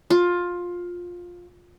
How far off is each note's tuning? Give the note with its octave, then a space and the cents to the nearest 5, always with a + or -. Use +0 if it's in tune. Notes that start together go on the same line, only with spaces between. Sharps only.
F4 +15